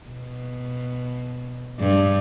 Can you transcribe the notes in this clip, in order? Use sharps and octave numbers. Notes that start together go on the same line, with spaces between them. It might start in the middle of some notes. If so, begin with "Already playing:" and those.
B2
G2